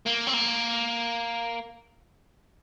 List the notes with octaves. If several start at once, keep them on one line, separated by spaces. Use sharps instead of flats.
A#3
C4
A#3